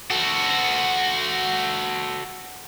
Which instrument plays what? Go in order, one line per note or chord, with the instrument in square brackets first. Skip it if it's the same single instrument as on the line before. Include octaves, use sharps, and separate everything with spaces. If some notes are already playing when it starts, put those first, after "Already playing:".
[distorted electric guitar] F#4 A4